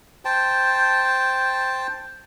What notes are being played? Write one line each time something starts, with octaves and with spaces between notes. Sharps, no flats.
C5 G5 A5